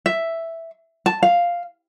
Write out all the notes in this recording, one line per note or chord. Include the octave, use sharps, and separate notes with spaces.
E5
A5
F5